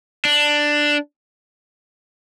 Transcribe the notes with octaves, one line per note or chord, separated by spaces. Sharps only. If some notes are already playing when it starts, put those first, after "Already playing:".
D4